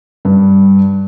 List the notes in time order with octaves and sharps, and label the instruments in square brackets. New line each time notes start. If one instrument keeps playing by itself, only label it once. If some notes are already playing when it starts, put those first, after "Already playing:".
[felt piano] G2